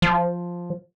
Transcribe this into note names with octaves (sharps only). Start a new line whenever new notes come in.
F3